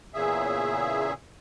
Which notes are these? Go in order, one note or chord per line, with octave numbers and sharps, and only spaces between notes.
E2 A#2 C#3 G#4 E5